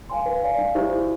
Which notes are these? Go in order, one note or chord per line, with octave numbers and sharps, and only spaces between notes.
F5 G#5 C6
B4
D5 F5 G#5
C#4
E4 G4 C5 E5
F#4